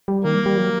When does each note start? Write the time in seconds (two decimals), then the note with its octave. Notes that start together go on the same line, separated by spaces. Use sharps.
0.08 G3
0.24 D#3 A#3
0.35 G3
0.46 G3
0.57 F#3